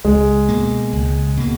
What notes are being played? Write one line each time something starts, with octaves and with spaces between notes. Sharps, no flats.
C#2 G#3
B2 A#3
C#2
B2 A#3